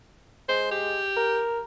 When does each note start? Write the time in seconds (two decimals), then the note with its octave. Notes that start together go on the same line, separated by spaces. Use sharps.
0.49 G#3 C5
0.71 G4
1.17 A#4